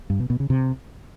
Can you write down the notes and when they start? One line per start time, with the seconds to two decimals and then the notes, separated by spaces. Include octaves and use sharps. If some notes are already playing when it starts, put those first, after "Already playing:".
0.10 G2
0.20 B2
0.30 B2
0.40 C#3
0.50 C3